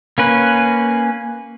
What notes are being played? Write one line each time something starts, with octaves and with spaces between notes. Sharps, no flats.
A#3 C#4 B4